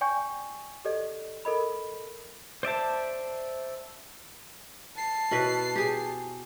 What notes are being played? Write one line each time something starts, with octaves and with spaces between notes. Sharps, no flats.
D5 G5 G#5 C#6 G6
G4 A4 D5 D#5
A4 A#4 D#5 B5
C5 D5 E5 A5
A5 C7
B2 E4 B4
G4 G#4